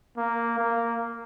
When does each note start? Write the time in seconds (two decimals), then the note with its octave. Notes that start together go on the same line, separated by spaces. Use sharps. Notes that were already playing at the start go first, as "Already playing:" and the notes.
0.17 A#3
0.58 A#3